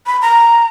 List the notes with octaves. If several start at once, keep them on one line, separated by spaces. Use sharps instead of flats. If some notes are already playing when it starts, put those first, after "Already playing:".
B5
A#5